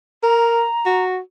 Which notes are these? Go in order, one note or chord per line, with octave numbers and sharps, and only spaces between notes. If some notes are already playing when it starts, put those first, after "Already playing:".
A#4 A#5
F#4